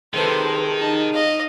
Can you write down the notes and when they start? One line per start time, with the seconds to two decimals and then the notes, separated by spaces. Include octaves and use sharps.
0.14 C3 D#3 G#3 A4 B4 C5
0.78 D#4 A5
1.13 D#5 F5